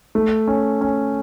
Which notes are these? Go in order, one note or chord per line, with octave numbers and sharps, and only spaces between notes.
A3
C#4
C#4